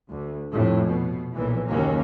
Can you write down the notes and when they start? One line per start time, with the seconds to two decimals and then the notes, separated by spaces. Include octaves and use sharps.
0.10 D2
0.52 F1 F2 A2
0.87 B2
1.33 B1 A#2 E3
1.68 F#1 D#2 A#3 C#4